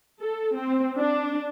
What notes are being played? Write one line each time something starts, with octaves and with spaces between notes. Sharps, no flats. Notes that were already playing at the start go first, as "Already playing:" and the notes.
A4
C4
D4